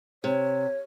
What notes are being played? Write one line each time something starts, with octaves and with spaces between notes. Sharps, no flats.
C3 C#5